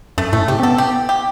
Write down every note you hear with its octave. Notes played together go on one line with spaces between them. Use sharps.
F#2 A3
A2 A3
C3 G4
C4
B3 A4
G4
G4